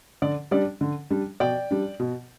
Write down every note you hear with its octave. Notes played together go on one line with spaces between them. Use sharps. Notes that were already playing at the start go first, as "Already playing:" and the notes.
D3 D5
G3 D4 D5
D3
G3 D4
B2 D5 G5
G3 D4
B2